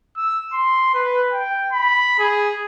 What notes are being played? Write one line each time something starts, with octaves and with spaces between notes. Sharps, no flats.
E6
C6
B4
G5
B5
G#4